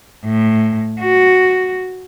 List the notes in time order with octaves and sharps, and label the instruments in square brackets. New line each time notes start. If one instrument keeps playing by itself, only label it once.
[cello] A2
F#4